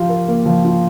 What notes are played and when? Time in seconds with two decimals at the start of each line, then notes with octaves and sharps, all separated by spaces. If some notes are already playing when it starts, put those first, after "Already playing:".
Already playing: F3 F4 G4
0.09 A#4
0.28 A#3
0.46 F3
0.64 F4